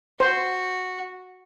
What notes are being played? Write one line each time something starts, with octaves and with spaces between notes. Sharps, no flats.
F#4 C5